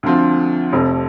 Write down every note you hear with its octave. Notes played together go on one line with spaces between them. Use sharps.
D2 D3 F3 C4 F4
F1 F2 C3